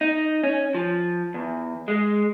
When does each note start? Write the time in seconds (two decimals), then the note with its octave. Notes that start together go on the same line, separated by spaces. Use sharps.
0.01 D#4
0.43 C#4
0.75 F3
1.34 E2
1.88 G#3